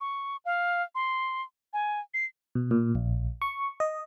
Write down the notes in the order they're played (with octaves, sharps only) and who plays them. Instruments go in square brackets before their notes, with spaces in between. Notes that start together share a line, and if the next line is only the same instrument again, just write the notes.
[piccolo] C#6
F5
C6
G#5
C7
[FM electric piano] B2
A#2
A#1
C#6
D#5